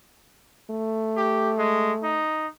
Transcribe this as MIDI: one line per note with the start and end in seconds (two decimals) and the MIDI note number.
0.70 2.24 57
1.17 1.52 67
1.58 1.92 56
2.03 2.47 63